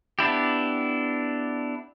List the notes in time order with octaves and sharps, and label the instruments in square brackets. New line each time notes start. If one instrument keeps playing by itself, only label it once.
[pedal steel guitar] B3 D4 E4 G4